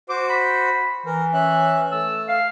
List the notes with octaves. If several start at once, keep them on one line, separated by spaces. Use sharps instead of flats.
F#4 C5 D6
B5
E3 A#4
C#4 E5 F#6
A3 A5 E6
F5